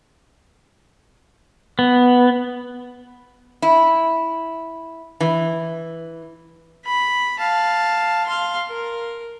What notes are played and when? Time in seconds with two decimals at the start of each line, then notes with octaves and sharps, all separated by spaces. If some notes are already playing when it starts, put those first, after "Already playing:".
1.79 B3
3.62 E4
5.20 E3
6.85 B5
7.39 F5 A5
8.26 F5 C6
8.68 A#4